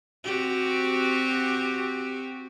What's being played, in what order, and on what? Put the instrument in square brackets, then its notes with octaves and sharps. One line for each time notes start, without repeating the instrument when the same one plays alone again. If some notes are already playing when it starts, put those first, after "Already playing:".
[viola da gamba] C4 F#4 G4